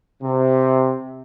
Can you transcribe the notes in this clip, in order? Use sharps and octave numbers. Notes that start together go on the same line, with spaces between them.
C3